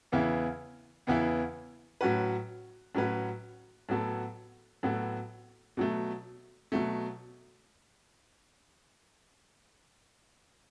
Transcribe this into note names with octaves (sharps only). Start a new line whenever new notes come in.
E2 C#3 E3 B3 E4
E2 C#3 E3 B3 E4
A2 F#3 C#4 F#4 B4
A2 F#3 C#4 F#4 B4
A2 F#3 B3 F#4 A4
A2 F#3 B3 F#4 A4
B2 F#3 A3
B2 F#3 A3